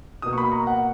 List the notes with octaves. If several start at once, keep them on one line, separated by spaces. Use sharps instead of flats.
B2 A#3 D#6
C#6
B5
A#5
F#5